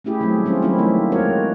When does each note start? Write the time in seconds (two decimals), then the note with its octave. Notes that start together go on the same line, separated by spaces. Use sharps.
0.04 A3 C#4 E4 G4 G#4
0.20 D#3 F#3 G3 A3 C4
0.45 G#3 C4 C#4 F4 G4
0.62 F#3 A#3 C4 C#4 D#4 E4
0.78 D#3 E3 G3 A3 A#3 C4
1.12 G#3 C4 F#4 A#4 C#5